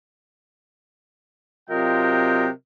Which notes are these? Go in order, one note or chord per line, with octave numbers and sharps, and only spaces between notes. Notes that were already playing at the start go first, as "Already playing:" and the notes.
C3 F#3 F4 A#4 D#5 G5